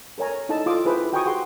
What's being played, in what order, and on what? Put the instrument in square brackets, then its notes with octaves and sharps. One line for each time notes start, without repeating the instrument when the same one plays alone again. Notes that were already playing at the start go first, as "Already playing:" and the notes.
[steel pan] A4 A#4 C#5 G#5 A#5
D#4 E4 A4 D#5 A5
F4 A4 D6 D#6
E4 G#4 A4 B4 C5 E5
F#4 G5 G#5 A#5 C#6 D#6
G4 G#4 F#5 C6